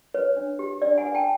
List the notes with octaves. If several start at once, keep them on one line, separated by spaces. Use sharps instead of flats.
B4 C#5
D4
G4
D4 D5
F#5 G#5
B4
G5 A5